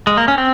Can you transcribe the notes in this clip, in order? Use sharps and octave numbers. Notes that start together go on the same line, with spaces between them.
G#3
A#3
C#4
C4